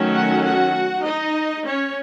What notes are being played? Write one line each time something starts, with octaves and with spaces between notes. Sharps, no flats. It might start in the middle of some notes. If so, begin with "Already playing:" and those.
Already playing: D#3 F#3 A3 C#4
F#4 F#5
F#4 F#5
D#4 D#5
C#4 C#5